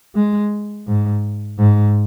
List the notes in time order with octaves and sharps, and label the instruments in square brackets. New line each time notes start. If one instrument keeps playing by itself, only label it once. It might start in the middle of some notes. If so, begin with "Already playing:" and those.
[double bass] G#3
G#2
G#2